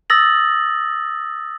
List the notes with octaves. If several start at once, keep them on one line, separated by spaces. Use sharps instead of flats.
D#6 E6 A6 A#6 F#7